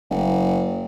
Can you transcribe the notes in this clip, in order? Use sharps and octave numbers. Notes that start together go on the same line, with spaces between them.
F#1